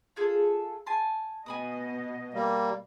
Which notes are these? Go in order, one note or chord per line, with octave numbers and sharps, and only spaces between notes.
F4 G#4 A4
G#5 A5 C6
B2 B3 D#5 G#5 B5 D#6
G3 A#3